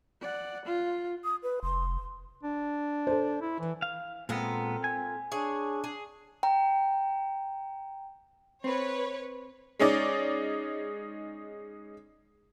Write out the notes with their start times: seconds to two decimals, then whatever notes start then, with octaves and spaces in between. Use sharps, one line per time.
0.21 D5 F#5
0.65 F4
1.24 D#6
1.43 B4
1.63 F1 C6
2.44 D4
3.07 A4 C5
3.42 E4
3.60 E3
3.82 F5
4.29 A#2 G#3 B3 C4 F4 A4 A#4
4.84 G#5
5.32 D4 G#4 C#5
5.84 G#4
6.43 G5 A#5
8.64 C4 B4 C#5
9.79 G#3 C#4 D#4 D5